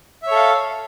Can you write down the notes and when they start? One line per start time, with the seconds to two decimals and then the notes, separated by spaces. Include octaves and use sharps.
0.22 E5
0.27 C#5
0.31 A4
0.35 F5